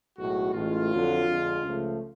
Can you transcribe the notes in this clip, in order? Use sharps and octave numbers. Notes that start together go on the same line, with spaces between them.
B1 A2 G#3 F#4
A1 A2 G#3 F4
F2 D3 F#3
F2 D3 G#3
C#2 C#3 F3 A3